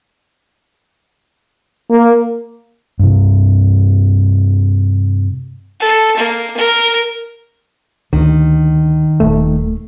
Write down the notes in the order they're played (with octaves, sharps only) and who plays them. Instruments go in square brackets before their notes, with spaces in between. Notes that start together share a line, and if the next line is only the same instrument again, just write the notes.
[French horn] A#3
[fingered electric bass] G2 C3
[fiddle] A4
A#3
A#4
[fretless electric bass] D2 [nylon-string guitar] D#3
[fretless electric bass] D#1 [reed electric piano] A3